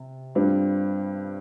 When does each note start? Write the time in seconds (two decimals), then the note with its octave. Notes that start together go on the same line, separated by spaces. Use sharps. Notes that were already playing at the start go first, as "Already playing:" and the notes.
Already playing: C3
0.35 G2 G3 C4 F4